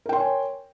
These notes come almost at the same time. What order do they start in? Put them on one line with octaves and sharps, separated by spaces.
A#4 G5 C6 C#5 G#5